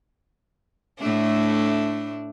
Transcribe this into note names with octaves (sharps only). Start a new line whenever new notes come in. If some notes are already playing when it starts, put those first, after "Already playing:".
A2 A3 D4